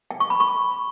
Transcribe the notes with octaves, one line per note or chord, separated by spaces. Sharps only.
G5
C#6
B5
C#6